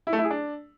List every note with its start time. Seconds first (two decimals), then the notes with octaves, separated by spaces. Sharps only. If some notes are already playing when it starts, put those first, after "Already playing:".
0.07 E4
0.13 A3
0.19 E4
0.24 G#4
0.30 D4